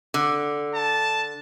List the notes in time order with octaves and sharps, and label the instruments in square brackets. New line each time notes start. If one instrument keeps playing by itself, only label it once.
[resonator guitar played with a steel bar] D3
[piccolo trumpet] A5